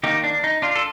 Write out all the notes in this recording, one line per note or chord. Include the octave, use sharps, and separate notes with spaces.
D#3 A#3 D#4 G4
D4
D#4
D4 F4
A4